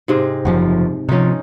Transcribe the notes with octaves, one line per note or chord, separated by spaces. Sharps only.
G#2 C3 G#3
F#1 F#2 F3
C3 F3 C#4 D#4